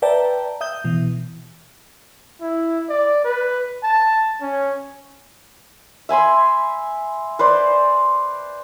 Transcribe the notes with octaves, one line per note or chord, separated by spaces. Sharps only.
B4 D5 E5 G5 A5 A#5
E5 D#6 G6
B2 E3
E4
D5
B4
A5
C#4
E5 G#5 B5 C6
B4 C5 D5